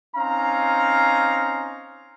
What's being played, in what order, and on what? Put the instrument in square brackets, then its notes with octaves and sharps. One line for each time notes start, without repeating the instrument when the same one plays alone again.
[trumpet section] C4 C#4 D#4 F5 A#5